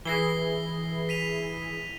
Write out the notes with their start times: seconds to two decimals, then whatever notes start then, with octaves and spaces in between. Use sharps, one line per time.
0.05 E3 E4 G#4 A#6 C7 G7
1.09 B6 D#7 F7